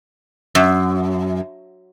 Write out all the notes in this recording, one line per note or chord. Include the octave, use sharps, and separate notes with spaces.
F#2